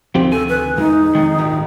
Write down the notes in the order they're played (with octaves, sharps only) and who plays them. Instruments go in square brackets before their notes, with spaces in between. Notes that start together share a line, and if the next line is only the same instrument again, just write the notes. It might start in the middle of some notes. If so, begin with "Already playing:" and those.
[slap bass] D2 C3 D#3 [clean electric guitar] F3 C4 G4
[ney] A4 [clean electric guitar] G#5
[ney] B4
[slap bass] E2 G#3 [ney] D#4
[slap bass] F2 G#3 [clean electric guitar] D#3
[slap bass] D#1 G#1 D2